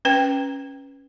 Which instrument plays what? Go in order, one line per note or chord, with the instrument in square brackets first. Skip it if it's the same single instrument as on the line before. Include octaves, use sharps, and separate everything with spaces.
[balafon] C#4 B4 G5